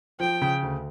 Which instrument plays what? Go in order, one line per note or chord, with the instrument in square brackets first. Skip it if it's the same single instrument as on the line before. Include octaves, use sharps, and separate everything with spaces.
[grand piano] F3 [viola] G5
[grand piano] C#3
D2